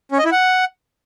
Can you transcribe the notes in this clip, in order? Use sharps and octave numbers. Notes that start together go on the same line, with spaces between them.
C#4
D#5
E4
F#5